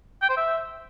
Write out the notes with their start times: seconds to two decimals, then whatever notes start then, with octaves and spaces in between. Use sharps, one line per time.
0.22 G5
0.29 C5
0.37 E5